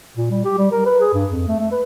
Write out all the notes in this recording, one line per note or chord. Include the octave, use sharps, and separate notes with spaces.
A#2
G3
G4
G3
A#4
B4
G#4
G2
F2
A3
A3
B4